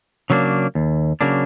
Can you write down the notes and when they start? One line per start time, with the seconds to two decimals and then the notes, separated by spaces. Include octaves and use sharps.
0.30 C#3 F#3 A#3 D4
0.75 D#2
1.21 C#3 F#3 A#3 D4